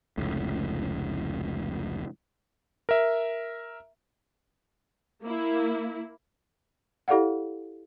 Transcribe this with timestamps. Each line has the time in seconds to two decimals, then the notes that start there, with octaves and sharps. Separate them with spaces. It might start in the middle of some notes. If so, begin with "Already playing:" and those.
0.17 F1 C#2 A2
2.89 A#4 E5
5.22 A#3 E4
7.08 E4 G4 A4 D5 F5 F#5